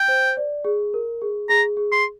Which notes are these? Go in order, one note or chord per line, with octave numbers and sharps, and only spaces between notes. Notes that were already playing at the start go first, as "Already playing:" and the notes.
Already playing: G5
C5
D5
G#4
A#4
G#4
G#4 A#5
G#4
C6